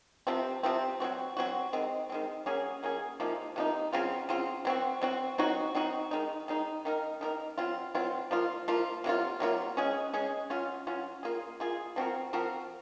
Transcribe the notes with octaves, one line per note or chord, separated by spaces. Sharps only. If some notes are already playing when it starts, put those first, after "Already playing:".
C3 F3 C4
C3 F3 C4
F#3 C4 F#4
F#3 C4 F#4
D#3 G#3 C4
D#3 G#3 C4
F#3 A#3 C#4 G#4
F#3 A#3 C#4 G#4
C3 F3 A#3 D#4
C3 F3 A#3 D#4
C#3 F#3 C4 F4
C#3 F#3 C4 F4
F#3 C4 F#4
F#3 C4 F#4
F#3 C4 D#4 F#4
F#3 C4 D#4 F#4
D#3 G#3 D#4
D#3 G#3 D#4
D#3 A#3 D#4 A#4
D#3 A#3 D#4 A#4
F#3 C4 F4
F#3 C4 F4
F3 A#3 F4
F3 A#3 F4
C3 F#3 A#3 F4
C3 F#3 A#3 F4
G#3 C#4 G#4
G#3 C#4 G#4
F#3 C#4 F4
F#3 C#4 F4
A#3 F4 G#4
A#3 F4 G#4
F3 C4 F#4 A#4
F3 C4 F#4 A#4